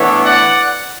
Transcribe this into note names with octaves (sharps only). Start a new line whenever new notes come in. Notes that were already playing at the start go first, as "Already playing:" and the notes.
Already playing: A2 E3 B3 D4 C#5 E5
D5 F#5